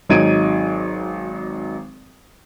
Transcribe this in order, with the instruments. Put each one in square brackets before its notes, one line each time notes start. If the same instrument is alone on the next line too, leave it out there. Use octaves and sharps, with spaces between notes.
[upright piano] G#1 F#3 D#4 G#6 D7 D#7